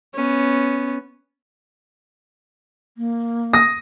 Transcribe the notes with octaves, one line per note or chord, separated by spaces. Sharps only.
B3 C#4
A#3
D#6 A#6